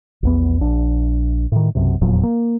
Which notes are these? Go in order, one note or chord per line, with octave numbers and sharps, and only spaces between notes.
A#1 E2 B3
A#1 D4
A2 D#3
B1 F#2 C3
F1 E2 A#2 F#3
A#3